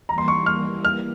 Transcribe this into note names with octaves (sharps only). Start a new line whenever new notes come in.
E3 G3 A#3 A#5
C6
C#6
F6
F6